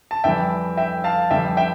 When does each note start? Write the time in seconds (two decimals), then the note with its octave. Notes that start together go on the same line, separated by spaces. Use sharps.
0.11 A5
0.24 F2 E3 G3 E5 G5
0.77 E5 G5
1.04 F5 A5
1.31 F2 E3 G3 E5 G5
1.57 E5 G5